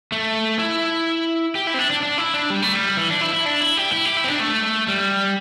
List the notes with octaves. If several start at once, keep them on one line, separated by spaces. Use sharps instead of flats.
A3
E4
G4
E4
C4
D4
D4
D4
E4
D4
G3
A3
G3
E3
D4
E4
E4
D4
E4
G4
E4
G4
E4
C4
D4
A3
G3